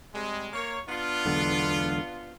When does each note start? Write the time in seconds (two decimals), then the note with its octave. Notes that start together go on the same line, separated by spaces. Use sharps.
0.14 C3 G3 G#3
0.53 A#3 A#4 C#5
0.89 B3 D4 F4
1.25 E1 B1 D3